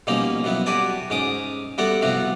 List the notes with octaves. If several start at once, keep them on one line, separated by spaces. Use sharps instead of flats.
B2 F3 G3 A#3 C#4 D#4
B2 F#3 B3 E4
F#4 G4 B4 D5 G#5 A5
G#2 C#4 D6 D#6
G3 A3 B3 F#4 D5 F#5
G2 C3 F3 B3 E4 F#4